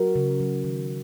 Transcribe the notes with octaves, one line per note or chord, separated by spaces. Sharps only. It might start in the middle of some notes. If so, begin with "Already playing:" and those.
Already playing: F#3 F#4 A#4
C#3
F#3
D#3